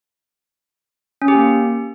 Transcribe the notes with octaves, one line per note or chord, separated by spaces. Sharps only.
C#4
G4
A#3